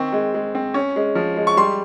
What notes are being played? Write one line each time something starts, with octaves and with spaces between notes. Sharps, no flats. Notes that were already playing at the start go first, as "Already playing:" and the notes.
Already playing: D#3 C4 C#6
G#3
G#3
C4
C#4
G#3
F3
G#3
C#6
G3 C6